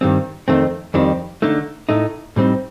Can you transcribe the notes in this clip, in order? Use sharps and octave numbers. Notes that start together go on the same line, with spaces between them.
G2 D#3 G3 C4
F2 D#3 A3 C4
F2 D#3 G3 C4
D3 A3 D#4
A2 A3 D#4
A2 G3 C4 D#4